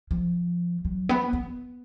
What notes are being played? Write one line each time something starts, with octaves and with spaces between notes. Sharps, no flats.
F3
F#3
B3
B3